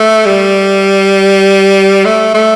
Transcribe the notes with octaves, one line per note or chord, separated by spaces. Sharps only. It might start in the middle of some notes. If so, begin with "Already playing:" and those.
Already playing: A3
G3
A3
A3